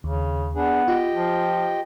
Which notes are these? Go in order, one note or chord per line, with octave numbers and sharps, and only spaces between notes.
D#2 C#3
B3 D4 G#4
F4 G4 D#5 G5
F3